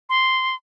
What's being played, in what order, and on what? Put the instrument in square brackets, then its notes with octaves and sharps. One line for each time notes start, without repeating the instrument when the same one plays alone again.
[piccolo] C6